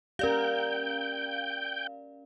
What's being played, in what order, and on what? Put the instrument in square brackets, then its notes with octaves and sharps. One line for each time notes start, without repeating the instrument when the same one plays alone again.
[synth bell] C#4 D5 F5 [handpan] G4 A#4 [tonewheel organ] G5 G6